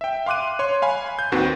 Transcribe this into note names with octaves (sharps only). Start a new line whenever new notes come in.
E5 G5
F5 C6 D6 F#6 D#7
C#5 C6
F5 G#5 B5
G6
D#2 D#3 C4 F#4 B4 C5